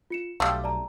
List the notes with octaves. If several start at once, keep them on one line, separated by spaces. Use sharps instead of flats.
F4 C#7 E7
B1 G3 A3 F5 C6
D5 A5 A#5